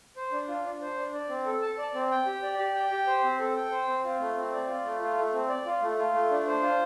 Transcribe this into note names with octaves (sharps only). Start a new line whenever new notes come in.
C5
D4
F4
D4
C5
D4
D5
C4
A4
A5
D5
C4
G5
G4
D5
G4
G5
G4
C5
C4
A4
G5
C5
C4
F4
A3
C4
D5
F4
A3
F4
A3
C4
D5
F4
A3
F4
A3
D4
C5
F4